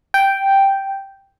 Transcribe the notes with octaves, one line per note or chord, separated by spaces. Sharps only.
G5